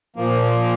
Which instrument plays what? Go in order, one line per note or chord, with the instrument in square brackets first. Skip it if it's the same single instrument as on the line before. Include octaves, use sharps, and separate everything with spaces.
[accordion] A#2 F3 A#3